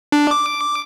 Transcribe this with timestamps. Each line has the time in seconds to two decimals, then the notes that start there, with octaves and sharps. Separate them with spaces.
0.12 D4
0.31 D6